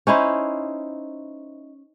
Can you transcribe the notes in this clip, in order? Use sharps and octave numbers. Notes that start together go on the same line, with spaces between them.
C#4 D#4 E4 C5